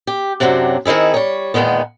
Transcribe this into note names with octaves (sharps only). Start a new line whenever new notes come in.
G4
F#2 C3 F#3 B3 C4 D4
D#3 C4 D#4 E4 G#4
G3 C#5
E2 A#2 D#3 G#3 B3